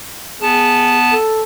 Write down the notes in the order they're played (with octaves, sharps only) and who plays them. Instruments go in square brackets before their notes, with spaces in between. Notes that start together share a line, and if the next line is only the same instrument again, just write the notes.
[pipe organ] B3 A5 [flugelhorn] G#4
[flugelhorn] A4